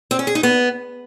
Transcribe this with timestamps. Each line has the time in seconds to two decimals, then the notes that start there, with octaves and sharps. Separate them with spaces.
0.11 C4
0.19 C#4
0.27 G#4
0.35 D#4
0.43 B3